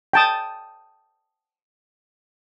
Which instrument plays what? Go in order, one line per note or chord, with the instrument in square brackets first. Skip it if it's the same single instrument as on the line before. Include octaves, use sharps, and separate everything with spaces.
[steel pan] G5 A5 D#6